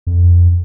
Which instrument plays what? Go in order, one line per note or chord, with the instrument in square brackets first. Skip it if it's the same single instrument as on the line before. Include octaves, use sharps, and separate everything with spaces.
[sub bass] F2